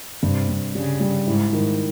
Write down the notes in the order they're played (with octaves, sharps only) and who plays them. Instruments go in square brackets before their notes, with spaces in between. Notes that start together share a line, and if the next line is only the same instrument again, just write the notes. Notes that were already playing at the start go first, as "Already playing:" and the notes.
[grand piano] G2 [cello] C3
[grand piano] G2
[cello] C#3 [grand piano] G3
[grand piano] G3
[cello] G#2 [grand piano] E4
[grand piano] D#3